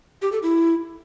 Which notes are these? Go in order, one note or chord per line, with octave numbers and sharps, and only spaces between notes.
G4
A4
E4